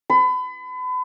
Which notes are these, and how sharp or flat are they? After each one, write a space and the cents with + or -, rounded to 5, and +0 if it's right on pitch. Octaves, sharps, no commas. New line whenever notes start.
B5 +35